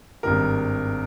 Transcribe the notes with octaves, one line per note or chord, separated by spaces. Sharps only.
G#1 G2 D#3 A#4